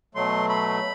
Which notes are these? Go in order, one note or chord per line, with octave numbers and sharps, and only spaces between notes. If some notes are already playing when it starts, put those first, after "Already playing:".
B2 F#3 A3 C6
B5